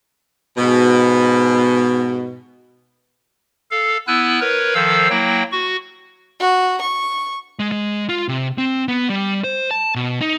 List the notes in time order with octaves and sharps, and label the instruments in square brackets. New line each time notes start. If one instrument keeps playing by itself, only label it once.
[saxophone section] G#2 B2
[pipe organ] A4 F5
B3 E4 G#5 E6 F#6
A#4 B4 C#5
D#3 F3 A4 C5 F5 E6
F#3 A#3 E4 G5
F#4 C#6
[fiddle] F#4
C#6
[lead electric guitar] G#3
G#3
F4
C3
C4
B3
G3
C5
A5
B2
D#4